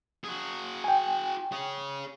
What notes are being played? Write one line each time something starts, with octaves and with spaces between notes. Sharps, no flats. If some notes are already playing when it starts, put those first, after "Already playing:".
F#4 G#4
G5 G#5
G#4 C#5